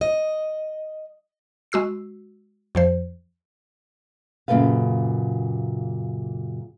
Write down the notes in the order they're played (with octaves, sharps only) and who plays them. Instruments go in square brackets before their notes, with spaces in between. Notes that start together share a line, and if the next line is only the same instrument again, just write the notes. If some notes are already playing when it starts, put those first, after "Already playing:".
[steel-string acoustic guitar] D#5
[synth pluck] G#3 F#4 E6 C7
F2 F3 C5
[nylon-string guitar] F#2 A#2 C#3 A4 B4 F5